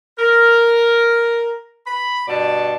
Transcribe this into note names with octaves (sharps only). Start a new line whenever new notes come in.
A#4
B5
G2 B2 D5 A5